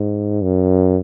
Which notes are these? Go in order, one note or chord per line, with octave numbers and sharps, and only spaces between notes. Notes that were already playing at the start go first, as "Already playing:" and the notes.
Already playing: G#2
F#2